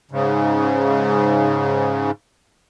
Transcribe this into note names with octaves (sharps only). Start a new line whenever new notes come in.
G#2 C#3